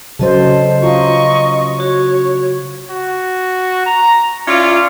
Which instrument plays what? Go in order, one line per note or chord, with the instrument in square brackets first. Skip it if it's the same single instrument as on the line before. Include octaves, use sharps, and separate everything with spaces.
[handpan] C#3 F#3 C5 [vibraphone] A4 D#5 A5
[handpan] F4 [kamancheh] D#5 C#6 [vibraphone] A#5
[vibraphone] F#4 [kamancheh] C#5
[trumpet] F#4
A#5
[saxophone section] C#4 E4 F4 [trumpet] D5